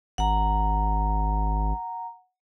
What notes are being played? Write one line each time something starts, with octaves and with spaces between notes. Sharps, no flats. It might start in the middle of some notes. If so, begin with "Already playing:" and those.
G#1 F#5 A#5